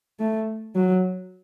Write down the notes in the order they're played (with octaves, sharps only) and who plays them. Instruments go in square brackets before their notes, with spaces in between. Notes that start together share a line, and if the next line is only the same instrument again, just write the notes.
[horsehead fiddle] A3
F#3